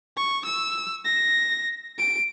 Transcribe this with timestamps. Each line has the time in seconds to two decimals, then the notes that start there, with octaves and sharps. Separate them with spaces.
0.17 C#6
0.45 E6
1.05 A#6
1.99 D7